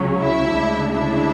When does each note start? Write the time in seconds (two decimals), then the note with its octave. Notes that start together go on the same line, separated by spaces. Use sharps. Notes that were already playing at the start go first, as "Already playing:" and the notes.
Already playing: C#2 C#3 F#3 C#4
0.20 E4 E5
0.55 D2 C#3 G#3 D4
0.91 E4 E5